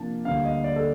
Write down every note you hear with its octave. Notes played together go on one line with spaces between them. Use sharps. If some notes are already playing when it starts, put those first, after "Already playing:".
Already playing: C3 F3 A#3 D4 A5
D2 D3 G3 A#3 F5
D#5
D5
A4